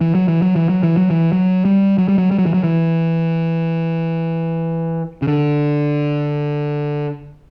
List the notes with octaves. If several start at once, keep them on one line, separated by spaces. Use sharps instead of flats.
E3
F#3
E3
F#3
E3
F#3
E3
F#3
E3
F#3
G3
F#3
G3
F#3
G3
F#3
E3
F#3
E3
C#3
D3